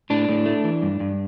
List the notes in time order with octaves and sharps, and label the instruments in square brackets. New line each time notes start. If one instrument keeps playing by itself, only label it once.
[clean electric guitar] A2 D4
A2
A3
E3
G2
G2